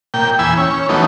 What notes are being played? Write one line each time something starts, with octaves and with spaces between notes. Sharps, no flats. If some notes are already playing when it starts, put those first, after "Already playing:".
A#2 G5
E2 G#5 B5 E6
C#4
E3 F#3 A3 B3 D#4